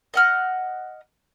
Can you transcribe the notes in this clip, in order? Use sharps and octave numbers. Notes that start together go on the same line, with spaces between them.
D#5 F#5 F6